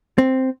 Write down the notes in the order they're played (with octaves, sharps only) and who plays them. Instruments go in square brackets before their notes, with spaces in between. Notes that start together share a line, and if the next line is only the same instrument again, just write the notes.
[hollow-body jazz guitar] C4